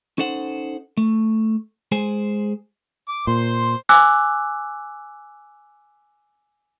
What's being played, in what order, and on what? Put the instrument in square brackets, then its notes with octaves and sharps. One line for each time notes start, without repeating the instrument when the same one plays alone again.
[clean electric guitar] C#4 D#4 A4 C5 F#5
A3
G#3 G#4 C5 G#5
[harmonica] D6
[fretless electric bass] A#2 [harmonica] C5 C6
[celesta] G#5 D6 E6 F#6